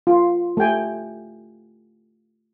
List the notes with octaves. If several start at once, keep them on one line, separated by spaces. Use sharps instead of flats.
F4
A3 G4 G5 G#5